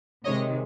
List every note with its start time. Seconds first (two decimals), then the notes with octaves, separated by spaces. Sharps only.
0.25 C3 D#3 G#3 C#5 D#5